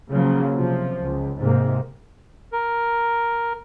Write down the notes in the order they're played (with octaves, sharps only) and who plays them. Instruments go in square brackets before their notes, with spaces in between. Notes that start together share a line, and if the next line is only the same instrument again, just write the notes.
[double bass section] C#3 F3 F#3 A#3
C3 F3
C#2
G#2 C3 A#3
[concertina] A#4